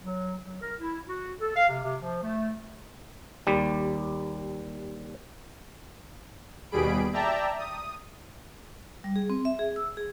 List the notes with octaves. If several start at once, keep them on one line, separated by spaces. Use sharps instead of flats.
F#3
F#3
A#4
E4
F#4
A4
F5
C3
C3
F3
A3
D#2 G3
D#2 B2 G3 G#4 B5 D7
D5 E5 G5 A5 A#5
D#6
G3
G#4
C4
E5
G#4
E6
G#4